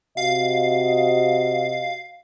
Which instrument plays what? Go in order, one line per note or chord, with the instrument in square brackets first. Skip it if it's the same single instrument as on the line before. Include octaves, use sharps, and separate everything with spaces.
[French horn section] C3 F#4 D#5 [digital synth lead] F5